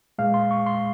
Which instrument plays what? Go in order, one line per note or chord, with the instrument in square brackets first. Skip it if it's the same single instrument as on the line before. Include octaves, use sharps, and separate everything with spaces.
[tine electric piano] A#2 G#3 F5
C6
C#6
C6